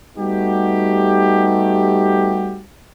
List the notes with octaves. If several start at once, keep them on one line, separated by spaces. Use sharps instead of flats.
G3 A3 B3 D#4 F#4 G4